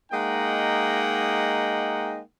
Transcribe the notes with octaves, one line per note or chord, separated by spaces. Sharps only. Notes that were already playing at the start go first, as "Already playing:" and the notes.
G#3 A#3 D#4 D#5 F#5 G5